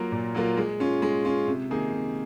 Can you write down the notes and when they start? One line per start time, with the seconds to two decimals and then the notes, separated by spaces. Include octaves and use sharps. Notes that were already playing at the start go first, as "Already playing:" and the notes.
Already playing: F#3 A#3 F4 A#4
0.12 A#2
0.35 F#3 A#3 F4 A#4
0.57 G#3
0.80 C#4 F4
1.02 G#3
1.25 C#4 F4
1.48 C3
1.70 D#3 A#3 D#4 G#4
1.92 C3